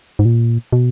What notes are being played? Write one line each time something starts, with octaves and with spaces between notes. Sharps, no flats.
G#2
A#2
B2